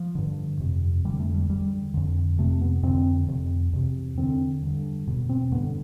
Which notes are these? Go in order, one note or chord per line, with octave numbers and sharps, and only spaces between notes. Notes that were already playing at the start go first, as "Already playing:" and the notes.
Already playing: F3
G2 D3
F2 C3
F2 D3 G3
A3
G3
E2 D3 G3
F2 D3
F2 C3 A3
B3
F2 D3 C4
F2 C3
E2 C3
E2 D3 C4
G2 D3
E2 B2
C4
G2 D3 B3